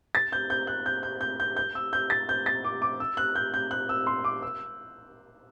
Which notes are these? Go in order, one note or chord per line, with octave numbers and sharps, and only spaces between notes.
A6
G6
G6
F#6
G6
G6
G6
G6
G6
E6
G6
A6
G6
A6
D6
D6
E6
F#6
G6
G6
F#6
E6
C6
D6
E6